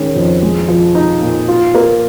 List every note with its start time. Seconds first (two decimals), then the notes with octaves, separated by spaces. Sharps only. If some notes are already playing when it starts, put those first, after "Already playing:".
Already playing: D#3 G#3 C#4
0.16 F2
0.42 G#3
0.68 F3
0.95 D#4
1.21 A#2
1.48 F4
1.75 A#3